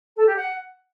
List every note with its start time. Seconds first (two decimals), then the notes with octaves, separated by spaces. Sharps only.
0.17 A4
0.26 G4
0.36 F#5